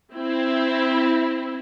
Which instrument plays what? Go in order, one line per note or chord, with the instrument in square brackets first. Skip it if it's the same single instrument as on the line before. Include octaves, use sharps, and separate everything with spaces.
[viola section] C4 E4